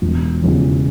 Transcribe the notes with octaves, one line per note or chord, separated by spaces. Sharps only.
E1
E2 C#3 E3 G3